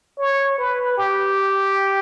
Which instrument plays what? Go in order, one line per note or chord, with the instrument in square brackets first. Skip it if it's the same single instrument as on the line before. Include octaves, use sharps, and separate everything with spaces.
[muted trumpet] C#5
B4
G4